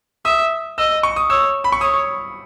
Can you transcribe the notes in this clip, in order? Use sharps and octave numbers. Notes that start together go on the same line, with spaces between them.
E5 D#6
D#5 E6
C#6
D#6
C#5 E6
B5
C#6
C#5 D#6